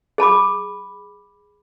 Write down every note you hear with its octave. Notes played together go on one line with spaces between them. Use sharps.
G#4 A5 B5 D6